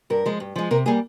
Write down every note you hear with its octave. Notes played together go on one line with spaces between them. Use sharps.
G2 A#4
F3 G#3
G2
F3 G#3
C3 A#4
G3 A#3 G#4